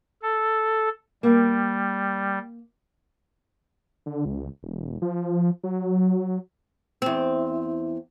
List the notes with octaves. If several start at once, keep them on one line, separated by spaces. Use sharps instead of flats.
A4
G3 A#3
D3
C#2
E1
F3
F#3
E2 C4